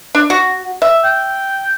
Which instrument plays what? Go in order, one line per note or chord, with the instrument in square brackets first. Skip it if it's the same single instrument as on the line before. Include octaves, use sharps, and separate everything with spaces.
[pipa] D4
F#4
E5
[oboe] G5